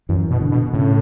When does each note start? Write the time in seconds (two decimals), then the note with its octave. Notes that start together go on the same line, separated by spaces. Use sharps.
0.09 F#2 E3
0.31 B2
0.42 D3
0.52 B2
0.73 A2 C#3